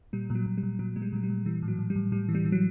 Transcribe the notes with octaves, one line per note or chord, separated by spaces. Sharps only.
A#2 G3
A#2
F#3
A#2
G3
A#2
A#2 F#3
A#2 G#3
G3
A#2 F#3
G3
A#2
E3 G3
A2
F#3
A2
G3
A2
A2 G3
E3
G3
E3
F#3